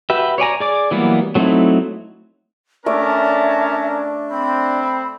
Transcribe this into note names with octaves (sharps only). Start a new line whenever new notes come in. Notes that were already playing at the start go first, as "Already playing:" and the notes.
F#4 G4 B4 E5
C#5 D5 G#5 A#5
G#4 D5 D6
E3 F#3 G3 A#3 B3
F#3 A3 C4 D#4 E4
A3 C#4 D4 A#4 D5 E5 A5
C4 B5